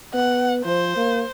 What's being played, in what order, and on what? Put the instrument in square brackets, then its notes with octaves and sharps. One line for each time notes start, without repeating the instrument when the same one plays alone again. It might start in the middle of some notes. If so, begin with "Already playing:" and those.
[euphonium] B3 [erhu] F#5
[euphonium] F3 [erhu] C5
[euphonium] A#3